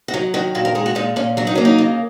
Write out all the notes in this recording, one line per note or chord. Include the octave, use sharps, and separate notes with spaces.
F#4
F#3 D#4
D#3 F#4
A#2 F#4
A#4
G#3 G#4
F#4
A#2 D#4
A#2 C#4
F#3 F#4
D#4
A#3 C#4
D#4
C#3